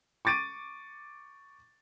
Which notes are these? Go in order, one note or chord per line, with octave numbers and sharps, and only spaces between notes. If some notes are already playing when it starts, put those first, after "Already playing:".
C#6 D6 A6 D7 D#7